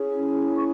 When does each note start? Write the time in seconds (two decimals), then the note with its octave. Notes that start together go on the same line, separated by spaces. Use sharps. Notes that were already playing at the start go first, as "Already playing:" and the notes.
Already playing: C#4 E4 G#4
0.57 C#6